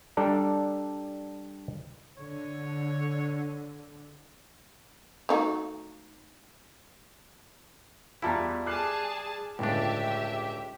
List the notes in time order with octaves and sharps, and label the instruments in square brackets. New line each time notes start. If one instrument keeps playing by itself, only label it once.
[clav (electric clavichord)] G3 D4 A4 D5 A#5
[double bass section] D3 [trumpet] C#5
[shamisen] A3 D#4 F#4
[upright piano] E2 E5 [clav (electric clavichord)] G3 E4 [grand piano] F4 A5 A#5
[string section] G#4 A5 [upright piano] D6 F#6 C7 [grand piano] F6
[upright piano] G1 [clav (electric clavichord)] C#2 D4 [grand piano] A2 [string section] G4 E5